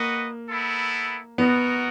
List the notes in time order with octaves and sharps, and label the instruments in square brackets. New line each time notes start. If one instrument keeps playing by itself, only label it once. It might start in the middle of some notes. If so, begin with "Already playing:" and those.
Already playing: [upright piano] A#3 [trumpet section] F#4 B4 D#5 F#5
[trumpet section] B3 E4 A4
[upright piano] B3 [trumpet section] F#4 A#4 D#5 F#5